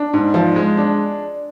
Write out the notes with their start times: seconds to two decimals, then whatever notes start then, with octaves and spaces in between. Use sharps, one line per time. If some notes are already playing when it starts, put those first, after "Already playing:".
Already playing: D4
0.14 G#2
0.34 F3
0.56 G#3
0.77 D4